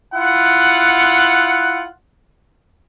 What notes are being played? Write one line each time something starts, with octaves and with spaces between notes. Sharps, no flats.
E4 F4 F#5